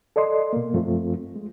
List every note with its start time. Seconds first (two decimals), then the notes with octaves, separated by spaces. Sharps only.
0.16 A4 D5 D#5 C6
0.53 B2 A#3
0.73 F#2 F3 A3 C4 F4
1.36 G#3